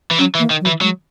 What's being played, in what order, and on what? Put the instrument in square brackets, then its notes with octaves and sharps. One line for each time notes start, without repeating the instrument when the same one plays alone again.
[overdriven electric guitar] E3
[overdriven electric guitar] F#3 [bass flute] C#4
[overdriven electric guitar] E3
[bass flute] A#3
[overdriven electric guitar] D#3
[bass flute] F#3
[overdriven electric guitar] E3
[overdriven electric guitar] F#3 [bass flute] G#3